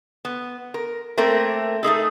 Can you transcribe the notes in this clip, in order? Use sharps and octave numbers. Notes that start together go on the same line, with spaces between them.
B3
A#4
A3 A#3 C4 A#4
A3 D#4 G#4 A4